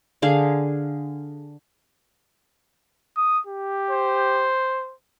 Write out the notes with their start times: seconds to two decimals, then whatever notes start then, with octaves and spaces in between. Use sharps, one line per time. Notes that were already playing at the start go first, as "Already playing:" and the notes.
0.22 D3 G#4 F5
3.17 D#6
3.47 G4
3.90 C5